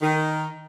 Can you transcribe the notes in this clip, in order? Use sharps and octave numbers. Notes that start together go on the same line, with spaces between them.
D#3